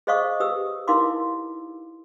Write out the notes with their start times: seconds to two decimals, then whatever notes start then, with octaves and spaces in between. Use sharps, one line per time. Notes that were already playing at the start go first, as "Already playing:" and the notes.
0.07 G#4 C5 D#5 F5 C#6 D#6
0.40 G4 B4 D#6 E6
0.88 D#4 E4 A#4 F5 C6 D6